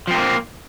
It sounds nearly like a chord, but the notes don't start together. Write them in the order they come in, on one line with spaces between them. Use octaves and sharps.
F3 C4 A3 A#3